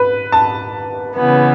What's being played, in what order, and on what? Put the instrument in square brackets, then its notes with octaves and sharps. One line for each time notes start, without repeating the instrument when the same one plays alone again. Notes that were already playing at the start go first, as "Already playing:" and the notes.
Already playing: [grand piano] B4
A5
[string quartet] C#3 E3 B3